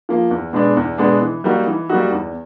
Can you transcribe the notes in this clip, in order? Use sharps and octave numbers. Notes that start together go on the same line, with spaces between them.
F3 A#3
E2
B2 G#3 B3 D4
E2
B2 G#3 B3 D4
E3
G3 A#3 D#4 F#4
E3
G3 A#3 D#4 F#4
E2